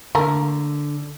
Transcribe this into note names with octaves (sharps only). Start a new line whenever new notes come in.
D3 A3 A#3 A#4